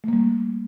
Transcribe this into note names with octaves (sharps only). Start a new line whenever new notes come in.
G3 A3 A#3